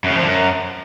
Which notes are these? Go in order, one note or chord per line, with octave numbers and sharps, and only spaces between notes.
F#2
C#3
F2
D3
F#2